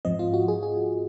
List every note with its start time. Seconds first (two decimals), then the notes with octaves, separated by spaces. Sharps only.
0.05 G#2 F3 C4 D#5
0.19 F4
0.34 F#4
0.48 G#4
0.63 G#4